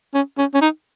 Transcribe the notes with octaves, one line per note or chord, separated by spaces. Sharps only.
C#4
C#4
C#4
D#4